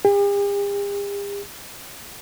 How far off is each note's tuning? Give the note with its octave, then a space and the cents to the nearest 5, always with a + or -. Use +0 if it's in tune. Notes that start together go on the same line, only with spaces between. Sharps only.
G4 +45